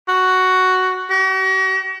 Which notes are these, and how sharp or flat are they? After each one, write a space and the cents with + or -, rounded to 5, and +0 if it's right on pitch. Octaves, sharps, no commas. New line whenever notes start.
F#4 +5
F#4 +45